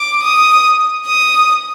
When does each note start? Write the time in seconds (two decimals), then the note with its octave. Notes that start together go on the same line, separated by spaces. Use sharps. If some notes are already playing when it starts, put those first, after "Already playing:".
Already playing: D6
0.23 D#6
1.07 D#6